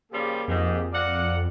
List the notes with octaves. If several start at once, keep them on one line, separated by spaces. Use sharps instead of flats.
C#3 F3 G3 A#3 G4 G#4
F2 G#2
A#3 D5 F#5